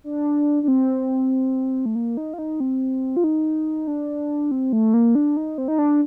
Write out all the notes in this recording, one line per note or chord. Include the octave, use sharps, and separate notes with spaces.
D4
D4
C4
A3
A#3
D#4
F4
D#4
C4
F4
D#4
D4
C4
A3
A#3
D4
D#4
C4
D#4
D4